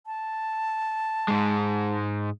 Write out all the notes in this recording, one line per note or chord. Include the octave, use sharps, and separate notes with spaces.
A5
G#2 G#3